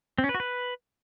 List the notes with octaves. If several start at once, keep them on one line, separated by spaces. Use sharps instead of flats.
C4
C#4
B4
F#4
B4